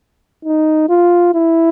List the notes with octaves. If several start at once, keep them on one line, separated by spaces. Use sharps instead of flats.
D#4
F4
E4